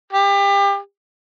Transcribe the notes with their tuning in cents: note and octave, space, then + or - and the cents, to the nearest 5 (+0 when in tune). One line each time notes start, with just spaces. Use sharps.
G4 +30